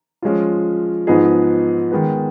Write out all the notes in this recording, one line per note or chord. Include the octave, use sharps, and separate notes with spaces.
F3 G#3 C#4 F4
G#2 F3 B3 D#4 G#4
D#3 G#3 B3